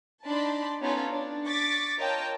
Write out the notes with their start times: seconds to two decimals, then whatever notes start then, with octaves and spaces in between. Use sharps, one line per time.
0.25 D4 D#4 D5 A5 B5 C6
0.82 B3 C#4 D#4 F4 A4 C#5
1.11 D4
1.46 C#6 D6 A6 B6
1.98 F4 A#4 C#5 D#5 G5 A5